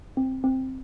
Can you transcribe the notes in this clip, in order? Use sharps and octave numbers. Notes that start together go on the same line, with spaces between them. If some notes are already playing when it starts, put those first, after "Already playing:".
C4
C4